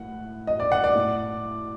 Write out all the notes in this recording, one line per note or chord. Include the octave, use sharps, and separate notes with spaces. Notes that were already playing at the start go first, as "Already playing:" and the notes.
Already playing: A2 F#5
D#5
D5
F#5
D5
A2